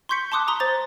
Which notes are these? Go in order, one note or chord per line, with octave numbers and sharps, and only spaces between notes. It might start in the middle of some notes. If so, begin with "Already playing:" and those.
C6 C#6 G6 B6 C#7
A5 C6 D6 D#6 F#6
A#5 C6 D#6 G7
C5 A6 F7